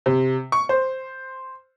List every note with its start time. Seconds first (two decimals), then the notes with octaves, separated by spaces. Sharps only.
0.06 C3
0.52 C#6
0.69 C5